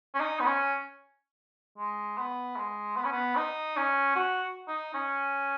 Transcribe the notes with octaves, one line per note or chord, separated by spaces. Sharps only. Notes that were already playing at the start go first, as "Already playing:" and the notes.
C#4
D#4
B3
C#4
G#3
B3
G#3
B3
C#4
B3
D#4
C#4
F#4
D#4
C#4